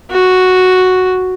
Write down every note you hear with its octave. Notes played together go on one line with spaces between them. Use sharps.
F#4